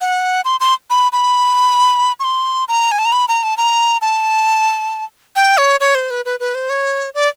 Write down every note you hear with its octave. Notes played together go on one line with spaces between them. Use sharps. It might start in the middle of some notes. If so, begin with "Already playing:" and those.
F#5
C6
C6
B5
B5
C#6
C6
A#5
G#5
A5
A#5
B5
A#5
A5
A#5
A5
G5
C#5
C#5
C5
B4
B4
B4
C5
C#5
D5